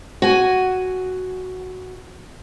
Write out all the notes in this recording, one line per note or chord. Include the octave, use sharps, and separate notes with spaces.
F#4 G#5